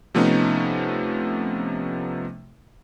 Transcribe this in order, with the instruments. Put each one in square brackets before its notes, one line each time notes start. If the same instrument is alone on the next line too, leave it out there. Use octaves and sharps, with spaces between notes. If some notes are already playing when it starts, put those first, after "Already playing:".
[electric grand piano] C3 F3 A3 B3 C#4 D#4